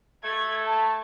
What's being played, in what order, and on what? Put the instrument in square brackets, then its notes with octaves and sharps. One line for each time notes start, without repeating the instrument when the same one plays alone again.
[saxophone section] A3 [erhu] G#6
[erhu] A5